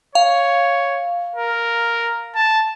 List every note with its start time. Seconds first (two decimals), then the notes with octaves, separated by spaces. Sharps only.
0.15 C#5 F5
1.36 A#4
2.35 A5